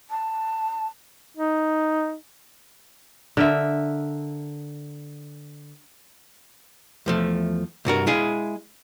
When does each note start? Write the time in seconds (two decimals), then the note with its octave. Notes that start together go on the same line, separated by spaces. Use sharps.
0.10 A5
1.37 D#4
3.37 D3 A#4 E5
7.06 E2 F3 A3
7.85 C2 G2 F#4 A#4
8.07 G#3 E4 G#4 F5